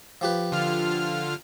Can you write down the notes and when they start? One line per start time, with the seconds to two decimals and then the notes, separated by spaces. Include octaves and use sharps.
0.21 F3 G4 B4
0.52 D3 F4 F6